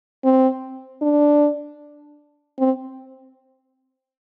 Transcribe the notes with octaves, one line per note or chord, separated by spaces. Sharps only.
C4
D4
C4